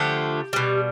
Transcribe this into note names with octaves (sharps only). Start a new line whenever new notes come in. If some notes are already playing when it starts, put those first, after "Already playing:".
Already playing: D3 F3 A3 G4
B2 G3